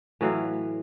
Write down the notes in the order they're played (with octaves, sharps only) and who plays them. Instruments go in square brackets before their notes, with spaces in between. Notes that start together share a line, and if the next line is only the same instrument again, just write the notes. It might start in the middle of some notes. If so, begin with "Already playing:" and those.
[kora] A2 E3 F#3 F5